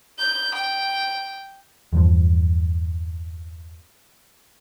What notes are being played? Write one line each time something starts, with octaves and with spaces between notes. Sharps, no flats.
G6
G5
E2 G2 F3